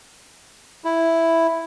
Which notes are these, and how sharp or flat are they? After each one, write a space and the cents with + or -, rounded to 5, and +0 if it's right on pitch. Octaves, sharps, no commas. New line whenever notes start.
E4 +0